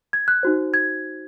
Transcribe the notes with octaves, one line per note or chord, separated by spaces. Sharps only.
G#6
F#6
D#4 F#4 C5
G#6